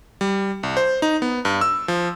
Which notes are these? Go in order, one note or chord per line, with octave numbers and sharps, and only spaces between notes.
G3
C2
C5
D#4
B3
G2
E6
F3